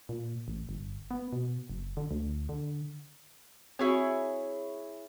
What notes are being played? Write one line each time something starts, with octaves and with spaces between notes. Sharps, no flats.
A#2
A1
G1
B3
B2
F#1
D3
D2
D3
C4 E4 F#4 G#4 C#5